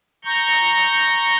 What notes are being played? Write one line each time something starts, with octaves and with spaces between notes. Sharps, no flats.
A#5 C#6 G6